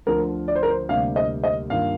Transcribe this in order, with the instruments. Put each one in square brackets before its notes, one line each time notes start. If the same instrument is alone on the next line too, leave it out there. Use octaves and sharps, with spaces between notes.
[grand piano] D2 D3 F3 [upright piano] A#4
[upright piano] D5
C5
A#4
C5
[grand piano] D2 C3 G3 A#3 D4 [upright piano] F5
[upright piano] D#5
D#5
[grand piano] G2 D#3 A#3 D4 F4 [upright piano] F5